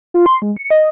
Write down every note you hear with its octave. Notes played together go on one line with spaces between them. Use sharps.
F4
C6
G#3
C#7
D#5